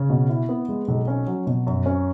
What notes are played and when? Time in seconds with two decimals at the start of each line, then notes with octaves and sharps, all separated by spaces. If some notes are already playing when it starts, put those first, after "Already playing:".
Already playing: C#3
0.10 B2
0.29 E4
0.49 B3
0.69 G#3
0.88 B1
1.08 C#4
1.27 F#3
1.47 B2
1.67 F#2
1.86 C#4